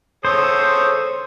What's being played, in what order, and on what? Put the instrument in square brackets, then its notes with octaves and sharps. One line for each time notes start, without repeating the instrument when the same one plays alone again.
[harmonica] A4 C#5 D#6 [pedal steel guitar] C5